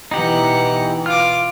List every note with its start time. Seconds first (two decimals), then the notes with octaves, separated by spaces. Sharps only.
0.11 B2 E3 D#4 G4 F#5
1.06 F4 D6 F6